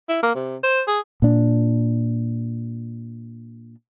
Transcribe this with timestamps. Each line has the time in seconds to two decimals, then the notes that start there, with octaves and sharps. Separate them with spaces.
0.09 E4
0.23 A#3
0.35 C3
0.63 C5
0.87 G#4
1.22 A#2 D4